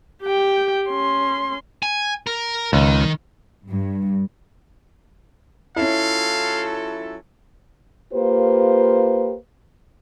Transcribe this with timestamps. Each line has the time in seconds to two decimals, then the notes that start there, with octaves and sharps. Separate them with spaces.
0.23 G4 G5
0.89 C#4 C6
1.83 G#5
2.27 A#4
2.73 C#2 D#3
3.68 G2
5.76 F#3 C#4 E4 F4 A4 F5
8.13 A#3 F4 G4 B4 C5